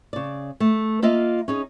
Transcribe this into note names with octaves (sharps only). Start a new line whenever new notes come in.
C#3 D5
A3
A#3 F4 D#5 E5
C#4 D#4 G#4